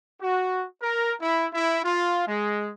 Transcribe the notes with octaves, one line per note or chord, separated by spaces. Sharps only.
F#4
A#4
E4
E4
F4
G#3